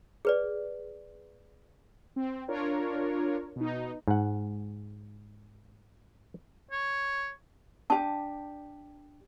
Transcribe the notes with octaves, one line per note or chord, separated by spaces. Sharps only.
G#4 B4 D5
C4
D4 F4 A#4 C#5
B2 D#4
G#2 F#5
C#5
D4 G4 A5